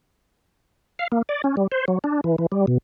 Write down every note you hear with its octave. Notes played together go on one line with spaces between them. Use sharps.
F5
A#3
D5
C#4
G3
C5
F#3
D4
E3
E3
G3
B2